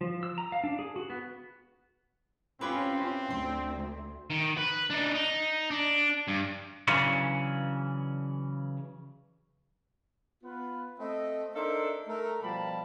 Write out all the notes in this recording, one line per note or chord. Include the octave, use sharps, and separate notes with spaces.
F3
E6
A#5
F5
D4
G#4
F#4
B3
C4 C#4 E4 F4 G4 B4
D2 C6
D#3
B4
D4 D#4
D#4
D4
G2
C#3 E3 F#3 C#4 D4
B3 F4 B4
A3 C4 D#5
D4 D#4 A4 A#4 C5 E5
A3 A#4
B2 F3 G3 G4 A5 B5